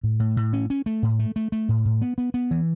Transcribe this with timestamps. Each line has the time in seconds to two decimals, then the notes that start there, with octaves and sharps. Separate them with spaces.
0.04 A2
0.20 A2
0.37 A2
0.53 C#4
0.70 C#4
0.86 A3
1.03 A2
1.19 A3
1.36 A3
1.52 A3
1.69 A2
1.85 A2
2.02 B3
2.18 B3
2.34 B3
2.51 E3